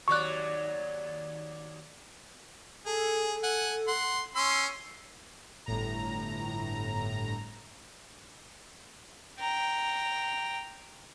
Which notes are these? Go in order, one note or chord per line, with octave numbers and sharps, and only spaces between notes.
D#2 F#3 D5 C#6 F#6
G#4 A4
F#5 G#5
F#5 C6
C#4 C6 E6
G1 A2 A#5
G5 A#5